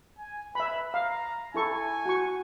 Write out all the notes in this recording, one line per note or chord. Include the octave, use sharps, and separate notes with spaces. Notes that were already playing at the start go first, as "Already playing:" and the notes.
G#5
B4 E5 B5
F5 A#5
E4 A4 G#5 C#6
F#4 C#6